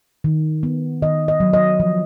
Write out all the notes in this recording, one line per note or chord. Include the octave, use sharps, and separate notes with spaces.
D#3
B3
D#3 D#5
D#5
F#3
D#5
F3